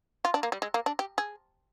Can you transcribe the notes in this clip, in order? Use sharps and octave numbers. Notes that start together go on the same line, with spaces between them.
F4
D4
A#3
G3
G#3
A#3
D4
G4
G#4